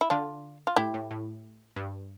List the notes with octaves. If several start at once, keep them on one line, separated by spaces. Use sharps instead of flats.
E4
D3 D4 F4
F4
A2 E4 G4
A2
A2
G2